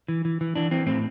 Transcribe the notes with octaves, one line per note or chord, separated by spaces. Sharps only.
E3
E3
E3
E3 D4
E3 C4
A2 C4